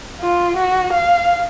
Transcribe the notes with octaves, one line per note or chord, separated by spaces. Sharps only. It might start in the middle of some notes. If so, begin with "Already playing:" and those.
F4
F#4
F5